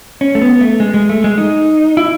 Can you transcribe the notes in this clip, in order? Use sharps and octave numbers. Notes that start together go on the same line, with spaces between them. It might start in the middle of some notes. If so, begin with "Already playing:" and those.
C#4
A3
B3
A3
G#3
G#3
A3
G#3
D#4
E4